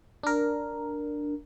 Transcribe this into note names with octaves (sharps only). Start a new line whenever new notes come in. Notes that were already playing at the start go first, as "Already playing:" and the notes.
D4 A#4